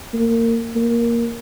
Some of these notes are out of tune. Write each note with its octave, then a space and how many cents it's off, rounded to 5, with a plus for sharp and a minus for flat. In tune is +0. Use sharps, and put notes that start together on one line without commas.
A#3 -25
A#3 +5